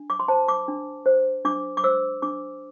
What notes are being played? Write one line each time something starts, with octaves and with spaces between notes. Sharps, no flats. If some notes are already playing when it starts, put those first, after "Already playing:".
Already playing: D4
D6
C6
C5 A5
D6
D4
C5
D4 D6
D6
C5 E6
D4 D6